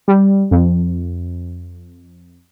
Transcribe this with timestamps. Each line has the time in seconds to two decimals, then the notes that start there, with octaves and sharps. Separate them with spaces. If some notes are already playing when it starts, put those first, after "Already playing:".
0.08 G3
0.51 F2